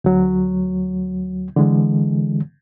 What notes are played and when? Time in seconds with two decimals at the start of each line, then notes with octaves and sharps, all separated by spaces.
0.04 D2 F#3
1.56 D3 E3 G#3